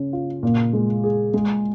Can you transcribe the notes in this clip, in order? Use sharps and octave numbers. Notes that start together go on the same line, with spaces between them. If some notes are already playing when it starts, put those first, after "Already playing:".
Already playing: C#3 C#4
F4
A#2
G#3
G#4
G#3